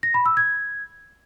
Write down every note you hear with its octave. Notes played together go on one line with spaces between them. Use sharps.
A#6
B5
E6
G#6